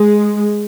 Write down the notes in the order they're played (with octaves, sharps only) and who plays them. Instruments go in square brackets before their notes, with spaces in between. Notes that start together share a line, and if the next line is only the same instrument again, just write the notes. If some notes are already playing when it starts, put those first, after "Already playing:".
Already playing: [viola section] G#3